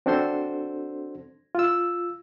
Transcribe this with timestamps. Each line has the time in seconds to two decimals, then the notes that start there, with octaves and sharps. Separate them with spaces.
0.06 C4 D4 F#4 A4 C5 C6
1.55 F4 E6